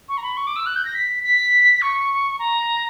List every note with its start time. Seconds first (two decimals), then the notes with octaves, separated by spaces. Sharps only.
0.09 C#6
0.17 A#5
0.23 B5
0.37 C#6
0.47 D6
0.56 E6
0.66 F#6
0.76 G6
0.85 A#6
0.95 B6
1.23 B6
1.82 C#6
2.39 A#5